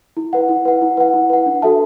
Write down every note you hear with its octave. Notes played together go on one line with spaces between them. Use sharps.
E4
B4 F#5
E4
B4 F#5
E4
B4 F#5
E4
B4 F#5
D4
F#4 A4 E5 A5